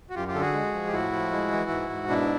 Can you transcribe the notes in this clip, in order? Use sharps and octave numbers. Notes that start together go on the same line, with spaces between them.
F#4
F#2 F4 G4
F4 G4
D3 A4
F#4 G#4
G#3
F3
G4
A2 E4 F#4
F3
G#3
E3
G#2
G#2
B2 D4 E4